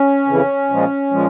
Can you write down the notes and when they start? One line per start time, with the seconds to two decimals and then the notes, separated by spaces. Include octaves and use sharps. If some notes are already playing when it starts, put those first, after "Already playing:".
Already playing: C#4
0.26 F2 C#3 E3
0.70 A#2 F3 G#3
1.11 A#2 F3 G#3